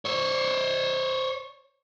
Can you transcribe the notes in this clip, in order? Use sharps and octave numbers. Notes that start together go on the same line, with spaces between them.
C5 C#5